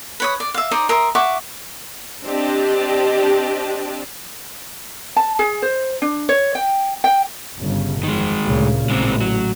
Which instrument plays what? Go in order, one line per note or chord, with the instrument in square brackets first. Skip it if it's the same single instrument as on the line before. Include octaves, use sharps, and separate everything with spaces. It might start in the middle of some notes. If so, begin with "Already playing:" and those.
[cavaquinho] B4 C#5 D#6
D5
E5 F5
D#4 C5 D5 D#6
A#4 E5 C6 D#6
E5 F#5 C#6 D6
[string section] C4 D4 G4 D5 D#5 A5
[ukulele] A5
G#4
C5
D4
C#5
G5
G5
[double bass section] G1 C#3
[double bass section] F2 [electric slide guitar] D#3 G#3
[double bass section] D2 A#2 C#3
[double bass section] A1 [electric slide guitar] G#3 C4
[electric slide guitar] F#3